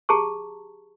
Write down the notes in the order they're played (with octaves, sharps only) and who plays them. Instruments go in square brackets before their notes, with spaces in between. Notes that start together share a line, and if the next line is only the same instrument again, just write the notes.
[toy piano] G4 G#4 A5 A#5 C#6